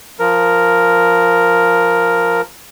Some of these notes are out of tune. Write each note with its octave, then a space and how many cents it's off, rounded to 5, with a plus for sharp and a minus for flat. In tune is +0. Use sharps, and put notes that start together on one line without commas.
F3 +0 A#4 +0